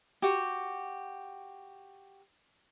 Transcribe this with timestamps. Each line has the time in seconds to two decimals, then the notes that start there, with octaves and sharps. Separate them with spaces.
0.22 F#4 G4